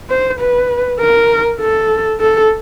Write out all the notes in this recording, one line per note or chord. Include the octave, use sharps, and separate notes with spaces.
C5
B4
A#4
A4
A4